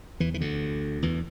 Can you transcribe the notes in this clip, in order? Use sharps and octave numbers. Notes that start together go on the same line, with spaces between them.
E2 E3
E3
D2 D3
E2 E3